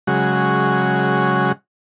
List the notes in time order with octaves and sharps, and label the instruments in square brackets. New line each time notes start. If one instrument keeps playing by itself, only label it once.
[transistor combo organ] C#3 F#3 G#3 F#4